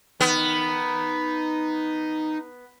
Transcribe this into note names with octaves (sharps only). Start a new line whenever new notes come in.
B3 D#4 G5